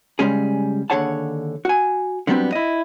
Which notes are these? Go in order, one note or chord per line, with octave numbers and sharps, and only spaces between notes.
C#3 F3 G3 G#3 C#4 G#4
D#2 D3 G#4 C#5 F#5 A5
F#4 G#5
D3 F#3 G3 B3 C4 D4
E4 D#5